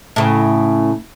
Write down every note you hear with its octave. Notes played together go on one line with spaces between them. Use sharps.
A2 C#3